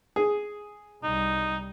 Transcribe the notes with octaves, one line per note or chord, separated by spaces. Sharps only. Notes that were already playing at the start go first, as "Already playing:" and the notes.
G#4
C2 G3 D#4